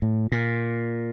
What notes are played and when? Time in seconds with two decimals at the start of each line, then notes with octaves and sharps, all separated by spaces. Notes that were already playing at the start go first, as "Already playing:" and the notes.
0.02 A2
0.32 A#2